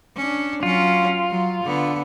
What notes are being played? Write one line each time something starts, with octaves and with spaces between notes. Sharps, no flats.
C#4 D4
F#3 C#4 F4
F#3
D3 B3